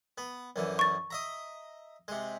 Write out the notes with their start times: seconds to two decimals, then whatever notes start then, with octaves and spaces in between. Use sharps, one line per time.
0.18 B3
0.56 F#2 D3 E3
0.79 C#6 A6
1.11 D#5 E5 A#5
2.08 C3 G#3